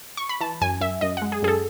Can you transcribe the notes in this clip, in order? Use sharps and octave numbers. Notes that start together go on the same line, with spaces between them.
C#6
B5
E3 A5
F#2 G#5
F#2 E5
F#2 D#5
G#3 F#5
G#4
F#2 G#4
A4